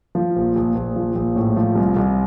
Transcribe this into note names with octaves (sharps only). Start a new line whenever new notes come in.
F3
A#1
A#1
A#1
F3
A#1
A2
F3
C2
C2